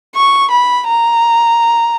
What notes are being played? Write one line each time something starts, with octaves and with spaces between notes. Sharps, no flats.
C#6
B5
A#5